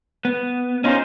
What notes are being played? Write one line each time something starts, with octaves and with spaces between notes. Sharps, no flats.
B3
C#4 D#4 F4 G4 G#4 C5